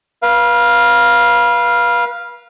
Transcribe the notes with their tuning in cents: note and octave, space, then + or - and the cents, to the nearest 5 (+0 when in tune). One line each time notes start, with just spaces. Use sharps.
B4 -35 F5 +0